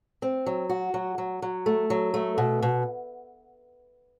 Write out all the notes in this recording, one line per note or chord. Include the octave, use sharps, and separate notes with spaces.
C4
F#3
F#4
F#3
F#3
F#3
A3
F#3
A3
B2
B2